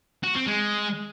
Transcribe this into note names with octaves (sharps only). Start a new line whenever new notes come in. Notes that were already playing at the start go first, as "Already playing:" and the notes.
F#4
C4
G#3